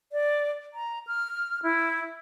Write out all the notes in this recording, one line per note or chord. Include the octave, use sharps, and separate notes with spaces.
D5
A#5
F6
E4